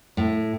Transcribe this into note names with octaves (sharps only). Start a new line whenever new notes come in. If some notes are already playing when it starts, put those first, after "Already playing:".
A2